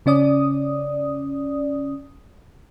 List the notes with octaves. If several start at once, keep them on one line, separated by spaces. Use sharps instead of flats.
C#3 C#4 D5 D#6